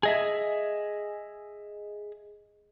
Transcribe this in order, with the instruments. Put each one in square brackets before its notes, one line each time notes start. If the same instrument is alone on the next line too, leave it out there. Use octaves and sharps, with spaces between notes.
[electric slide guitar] G#4 D#5 E5